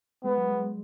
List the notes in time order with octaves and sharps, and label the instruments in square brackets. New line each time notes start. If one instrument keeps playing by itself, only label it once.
[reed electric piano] G#3 [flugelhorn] B3
[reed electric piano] F#3
G#3